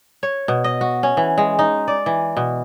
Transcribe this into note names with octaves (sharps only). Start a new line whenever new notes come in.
C#5
B2
D#5
F#4
C#4
E3
G#3
D#4
D5
E3
B2